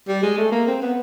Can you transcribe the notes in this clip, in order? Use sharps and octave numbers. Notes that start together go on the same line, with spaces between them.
G3
G#3
A3
A#3
C4
B3